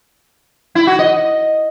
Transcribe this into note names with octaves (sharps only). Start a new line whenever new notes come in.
E4
F#4
D#5